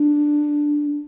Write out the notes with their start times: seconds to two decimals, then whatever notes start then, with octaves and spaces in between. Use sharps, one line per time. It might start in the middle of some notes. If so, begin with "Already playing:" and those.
Already playing: D4